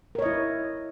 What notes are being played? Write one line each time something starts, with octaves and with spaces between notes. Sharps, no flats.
E4 A#4 C#5 D#5